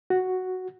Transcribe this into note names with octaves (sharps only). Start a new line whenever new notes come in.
F#4